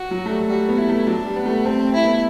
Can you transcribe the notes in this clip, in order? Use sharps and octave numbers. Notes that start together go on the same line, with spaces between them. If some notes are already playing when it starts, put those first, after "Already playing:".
Already playing: F#4
F#3
A3
G3
G3 F#4
B3
E4
A3
F#3 D4
G3
B3
A3
A3 C4
E4
B3